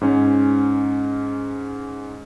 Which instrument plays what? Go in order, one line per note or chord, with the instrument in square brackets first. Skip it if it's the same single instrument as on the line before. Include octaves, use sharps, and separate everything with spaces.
[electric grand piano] G#2 C#4